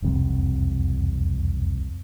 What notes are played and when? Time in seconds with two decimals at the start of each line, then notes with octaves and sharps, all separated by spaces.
0.02 E1 C2 F2 C3